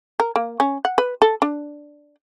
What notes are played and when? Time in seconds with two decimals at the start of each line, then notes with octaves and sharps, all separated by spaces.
0.20 A#4
0.36 A#3
0.60 C#4
0.85 F#5
0.98 B4
1.22 A4
1.42 D4